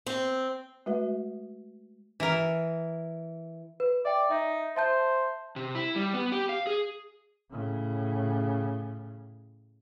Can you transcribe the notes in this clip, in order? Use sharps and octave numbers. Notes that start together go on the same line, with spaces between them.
C4
G#3 A3 F#4 B4 E5
E3 A#4
B4
D5 E5 G5
D#4 E5
C5 E5 A5 G6
C3
E4
G3
B3
G4
F5
G#4
A2 C#3